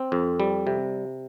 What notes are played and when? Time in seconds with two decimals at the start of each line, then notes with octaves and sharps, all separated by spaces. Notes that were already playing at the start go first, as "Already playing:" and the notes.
Already playing: C4
0.12 F2
0.40 G3
0.67 C3